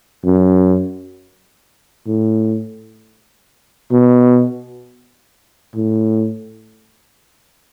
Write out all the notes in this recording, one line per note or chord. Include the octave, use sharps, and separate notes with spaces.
F#2
A2
B2
A2